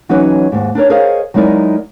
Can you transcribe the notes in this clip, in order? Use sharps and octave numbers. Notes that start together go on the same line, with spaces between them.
E3 F#3 C#4 D#4 F#4 B4
D#2 G#2
D4 D#4 A#4 C#5
G#4 A#4 C5 C#5 D#5 F5
F#3 G#3 D#4 E4 A#4 D5